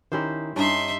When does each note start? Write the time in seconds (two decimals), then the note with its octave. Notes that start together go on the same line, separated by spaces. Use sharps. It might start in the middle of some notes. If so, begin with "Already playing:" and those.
0.12 D#3 C#4 E4 G4 C5 A#5
0.56 G2 C#4 D#4 E5 C6